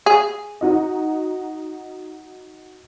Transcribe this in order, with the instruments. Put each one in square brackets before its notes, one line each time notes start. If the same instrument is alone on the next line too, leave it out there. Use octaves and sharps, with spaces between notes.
[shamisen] G#4
[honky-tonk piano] D#4 F#4 D#5